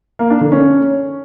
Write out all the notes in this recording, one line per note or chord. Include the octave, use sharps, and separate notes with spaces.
A#3
D4
D3
C#4